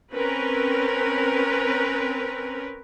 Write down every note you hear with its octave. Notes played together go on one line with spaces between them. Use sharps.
C4 C#4 A#4 B4